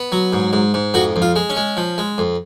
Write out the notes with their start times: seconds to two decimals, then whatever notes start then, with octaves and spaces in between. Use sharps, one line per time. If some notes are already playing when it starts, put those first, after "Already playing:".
Already playing: B3
0.12 F#3
0.33 G#2
0.53 G#2
0.74 G#2
0.94 F2 F#4
1.16 F2
1.22 F4
1.36 G#3
1.50 C#4
1.57 G#3
1.77 F3
1.98 G#3
2.18 F2